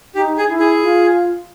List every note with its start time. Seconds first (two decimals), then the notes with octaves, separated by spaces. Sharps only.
0.15 D#4 G4
0.37 G#4
0.48 E4
0.60 G#4
0.82 F4